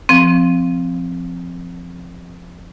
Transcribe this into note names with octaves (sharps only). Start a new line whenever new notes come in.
F3 C4